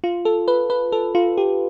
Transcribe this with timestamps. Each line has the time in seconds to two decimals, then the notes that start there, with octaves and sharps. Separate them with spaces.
0.04 F4
0.25 A4
0.48 B4
0.70 B4
0.92 A4
1.15 F4
1.38 G4